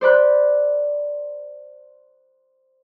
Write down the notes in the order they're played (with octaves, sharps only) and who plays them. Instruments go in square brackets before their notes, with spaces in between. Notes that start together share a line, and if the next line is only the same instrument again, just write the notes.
[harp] C5 D5 B5 F#6